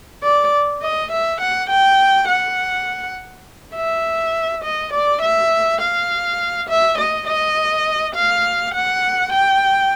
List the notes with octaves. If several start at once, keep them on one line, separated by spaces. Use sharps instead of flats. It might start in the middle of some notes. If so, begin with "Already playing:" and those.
D5
D#5
E5
F#5
G5
F#5
E5
D#5
D5
E5
F5
E5
D#5
D#5
F5
F#5
G5